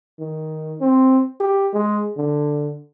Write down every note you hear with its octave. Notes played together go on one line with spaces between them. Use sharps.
D#3
C4
G4
G#3
D3